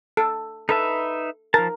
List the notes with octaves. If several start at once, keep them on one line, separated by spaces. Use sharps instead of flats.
A4
D#4 A4 B4 E5
F3 A#4 A5